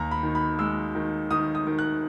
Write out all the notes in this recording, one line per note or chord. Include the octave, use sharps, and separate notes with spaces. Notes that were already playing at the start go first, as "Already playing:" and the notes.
Already playing: D#2 A#5
B5
D#3
B5
G#3 E6
D#3
D#3 D#6
D#6
D#3
F#6